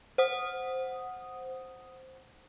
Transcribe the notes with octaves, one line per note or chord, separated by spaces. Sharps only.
C5 F#5 D#6